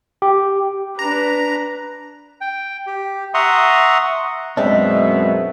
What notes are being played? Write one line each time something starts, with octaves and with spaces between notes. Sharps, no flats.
G4
D4 B4 A#5
G5
G4
E5 F#5 A#5 C6 C#6 D#6
F#2 B2 G#3 C4 D4 D#4 E5